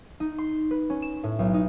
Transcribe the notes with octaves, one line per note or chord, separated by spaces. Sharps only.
D#4
C6
B4
C#4
E7
A2
B1
D#4